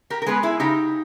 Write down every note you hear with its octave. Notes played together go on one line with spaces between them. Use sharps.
G4 A#4
A#4
G#3 B3 G#4 B4
E4 G#4
C#3 D#4 G4